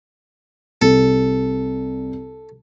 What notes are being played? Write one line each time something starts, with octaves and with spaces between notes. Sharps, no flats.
C2 A4